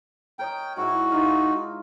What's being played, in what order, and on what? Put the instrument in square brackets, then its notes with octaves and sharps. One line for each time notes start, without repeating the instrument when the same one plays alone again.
[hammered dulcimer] A#4 C#5 D#5 [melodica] G5
[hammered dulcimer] G#2 E4 [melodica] F#4
[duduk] D#4 [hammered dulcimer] F4